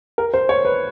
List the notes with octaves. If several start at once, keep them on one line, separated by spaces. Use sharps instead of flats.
A#4
C5
C#5
B4